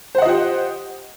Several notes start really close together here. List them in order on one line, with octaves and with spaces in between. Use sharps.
C5 F#5 D#5 F4 G4